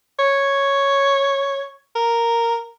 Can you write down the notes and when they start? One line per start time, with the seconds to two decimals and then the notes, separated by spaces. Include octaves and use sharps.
0.19 C#5
1.96 A#4